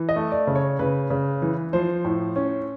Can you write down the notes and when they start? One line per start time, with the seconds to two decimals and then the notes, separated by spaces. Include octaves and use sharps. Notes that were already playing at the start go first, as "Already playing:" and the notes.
Already playing: E3
0.09 D#5
0.16 A3
0.32 D5
0.47 C#3
0.55 C#5
0.79 C#3 B4
1.10 C#3
1.42 E3
1.73 F3 C5
2.05 A2
2.36 C#4